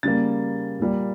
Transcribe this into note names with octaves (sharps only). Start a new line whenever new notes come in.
C#3 G3 A#3 A6
A#2 G3 A#3